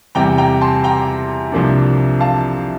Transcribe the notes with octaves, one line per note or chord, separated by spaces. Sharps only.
E2 C3 G3 G5 A#5
G5 A#5
A5 C6
G5 A#5
C2 C3 F3 A#3 D4
F5 A5